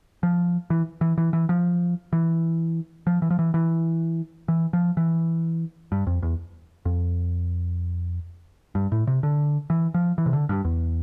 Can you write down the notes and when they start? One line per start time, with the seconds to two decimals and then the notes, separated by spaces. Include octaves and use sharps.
0.23 F3
0.70 E3
1.01 E3
1.18 E3
1.33 E3
1.49 F3
2.13 E3
3.07 F3
3.22 E3
3.31 F3
3.39 E3
3.54 E3
4.48 E3
4.73 F3
4.97 E3
5.92 G2
6.07 F2
6.22 E2
6.85 F2
8.75 G2
8.92 A2
9.07 C3
9.23 D3
9.70 E3
9.94 F3
10.18 E3
10.26 C3
10.33 D3
10.49 G2
10.65 E2